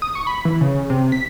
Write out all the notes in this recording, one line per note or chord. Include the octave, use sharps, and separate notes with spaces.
D#6
C#6
B5
E3
C#3
C3
B6